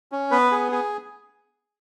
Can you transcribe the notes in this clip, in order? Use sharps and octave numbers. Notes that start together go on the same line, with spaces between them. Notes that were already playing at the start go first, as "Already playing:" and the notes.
C#4
B3 B4
G#4
G#4